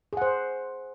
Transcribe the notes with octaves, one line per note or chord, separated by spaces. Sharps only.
G#4 C5 F#5